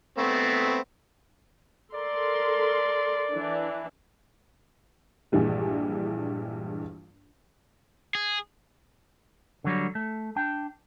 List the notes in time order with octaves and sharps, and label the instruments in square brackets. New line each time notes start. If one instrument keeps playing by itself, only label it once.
[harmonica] A3 B3 C4
[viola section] A4 A#4 C6 [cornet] D5
[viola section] E3 D4
[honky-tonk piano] A#1 G2 E3 G3 G#3
[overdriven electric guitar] G#4
[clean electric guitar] D3 F#3 G3
A3
D4 G5